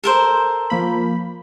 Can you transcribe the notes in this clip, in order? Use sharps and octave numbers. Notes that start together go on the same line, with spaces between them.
A4 A#4 C5
F3 A#3 B5